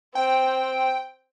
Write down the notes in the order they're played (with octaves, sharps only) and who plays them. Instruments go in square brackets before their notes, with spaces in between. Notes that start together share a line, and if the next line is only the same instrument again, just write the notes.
[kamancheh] C4 [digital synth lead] G5